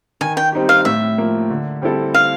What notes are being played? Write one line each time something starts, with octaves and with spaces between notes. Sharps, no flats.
D#3 G#5
G5
G3 C4 D#4 G4
F5
A2 E5
F3 A#3
D3
G3 C4 E4 A4
F5